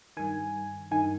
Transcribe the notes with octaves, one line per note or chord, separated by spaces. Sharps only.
G2 D#3 G#5
G2 D#3 G#5